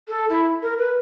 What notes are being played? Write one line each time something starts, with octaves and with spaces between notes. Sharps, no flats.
A4
E4
A#4
B4